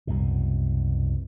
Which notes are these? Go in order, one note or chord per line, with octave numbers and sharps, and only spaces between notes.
C2 F#2 B2